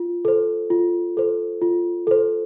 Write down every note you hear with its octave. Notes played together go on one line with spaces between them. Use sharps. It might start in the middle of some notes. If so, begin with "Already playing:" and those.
Already playing: F4
A4 C5
F4
A4 C5
F4
A4 C5